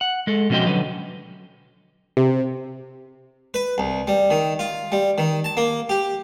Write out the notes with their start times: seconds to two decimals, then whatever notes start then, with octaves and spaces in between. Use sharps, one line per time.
0.01 F#5
0.27 G#3 A4
0.50 B2 F3 C#4 F#4 D#5 G5
0.67 D3 F#3 B4
2.17 C3
3.54 B4
3.78 C2
4.07 G3
4.30 D#3
4.59 F4
4.92 G3
5.18 D#3
5.44 A5
5.57 A#3
5.89 G4